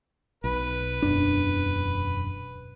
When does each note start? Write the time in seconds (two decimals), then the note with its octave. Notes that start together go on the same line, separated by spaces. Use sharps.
0.44 B1 B4
1.02 E1 F#2 D4